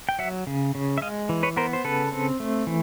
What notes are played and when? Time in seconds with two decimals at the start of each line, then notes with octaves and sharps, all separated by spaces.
0.09 G5
0.19 F#3 E5 F#5
0.47 C#3
0.75 C#3
0.98 E5
1.01 G#3 D#5 F5
1.29 E3
1.43 B4 C#5
1.57 B3 A#4 C5
1.73 C5
1.84 C#3 A4 B4
2.12 C4
2.40 A3
2.67 E3